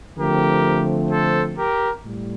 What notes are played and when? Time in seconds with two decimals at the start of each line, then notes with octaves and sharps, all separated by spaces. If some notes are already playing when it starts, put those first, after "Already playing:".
0.18 D3 F3 A3 C4 G4 A#4
1.10 A4 C5
1.58 G4 A#4
2.04 A2 G3